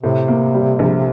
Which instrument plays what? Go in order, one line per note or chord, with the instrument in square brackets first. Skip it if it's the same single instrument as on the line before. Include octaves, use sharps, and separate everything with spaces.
[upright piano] A2 [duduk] C3
[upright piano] A#3
G3
A#1